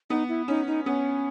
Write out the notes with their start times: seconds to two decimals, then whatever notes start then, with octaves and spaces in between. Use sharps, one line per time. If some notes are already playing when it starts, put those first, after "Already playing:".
0.10 B3 D#4
0.29 E4
0.48 C#4 D#4
0.67 D#4
0.86 B3 C#4